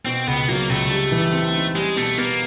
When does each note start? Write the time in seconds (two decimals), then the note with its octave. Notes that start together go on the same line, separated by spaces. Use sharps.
0.05 B2 C4
0.27 C#2 B3
0.49 F#3 A#3
0.70 C#2 A3
0.91 G3
1.12 E3
1.33 C4
1.54 D#4
1.75 G3 G#3
1.96 B2 A3
2.18 A#3 B3